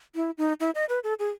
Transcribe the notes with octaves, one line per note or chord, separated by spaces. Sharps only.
E4
D#4
E4
D#5
B4
A4
G#4